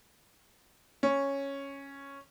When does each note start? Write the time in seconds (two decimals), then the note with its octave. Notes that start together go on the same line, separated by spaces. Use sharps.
1.03 C#4